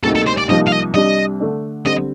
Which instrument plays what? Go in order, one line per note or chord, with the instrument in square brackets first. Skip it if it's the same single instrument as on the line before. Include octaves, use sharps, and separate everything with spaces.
[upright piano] D2 C3 G3 A#3 D#4 [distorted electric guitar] A4
[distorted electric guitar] A4
C5
D5
[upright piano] C2 C3 F3 A#3 D#4 [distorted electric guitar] D#5
[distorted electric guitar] F5
D#5
[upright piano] C2 C3 G3 D4 [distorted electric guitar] D#5
[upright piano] D3 A3 D4
[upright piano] D3 G3 C4 [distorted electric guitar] D#5